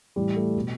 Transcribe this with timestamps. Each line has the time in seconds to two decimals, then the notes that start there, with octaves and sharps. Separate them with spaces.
0.16 A2 E3 G3
0.36 A3
0.55 B2